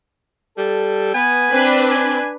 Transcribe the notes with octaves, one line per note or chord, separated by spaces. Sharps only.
G3 A4
B3 G#5
C4 D4 B4
G#5